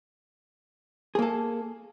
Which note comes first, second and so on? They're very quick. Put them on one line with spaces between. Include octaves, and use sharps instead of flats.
G#4 A#3 A4